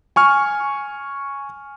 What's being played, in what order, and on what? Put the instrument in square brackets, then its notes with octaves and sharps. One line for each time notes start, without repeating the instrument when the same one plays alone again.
[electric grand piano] G#5 C#6 F6